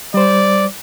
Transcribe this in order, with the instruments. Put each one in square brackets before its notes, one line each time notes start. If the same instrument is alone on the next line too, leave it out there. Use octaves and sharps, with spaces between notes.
[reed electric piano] G3 C5 [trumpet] D5